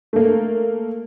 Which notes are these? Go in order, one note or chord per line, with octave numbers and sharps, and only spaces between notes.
A3 A#3